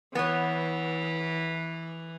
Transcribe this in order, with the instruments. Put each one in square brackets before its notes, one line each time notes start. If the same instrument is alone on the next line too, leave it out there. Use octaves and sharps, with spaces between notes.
[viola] E3 [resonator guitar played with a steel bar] B3 C#5